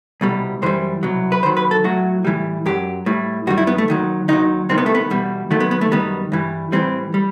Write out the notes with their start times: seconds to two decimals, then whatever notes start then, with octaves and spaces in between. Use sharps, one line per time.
0.21 C2 B2 G3
0.62 F#2 E3 G3 C5
1.03 C2 B2 F#3
1.32 B4
1.43 D#2 D#3 F#3 C5
1.57 B4
1.71 A4
1.84 A2 F#3 F#4
2.25 A2 E3 G3
2.66 F#2 F#3 G4
3.06 A2 G3
3.47 F#2 D#3 G3 F#4
3.58 E4
3.67 B3
3.78 A3
3.88 D#2 D#3 F#3
4.28 D#2 D#3 F#3 D#4
4.69 C2 C3 D#3 C4
4.78 B3
4.86 A3
4.95 B3
5.10 E2 B2 G3
5.51 D#2 D#3 F#3 A3
5.60 B3
5.71 B3
5.81 A3
5.92 F#2 D#3 G3 B3
6.32 G2 E3 G3
6.72 A2 E3 G3 C4
7.14 G3